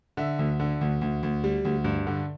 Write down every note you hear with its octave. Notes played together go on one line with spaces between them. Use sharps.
D3 E5
D2
D3
D2
D2
D2
G3
D2
G2
D3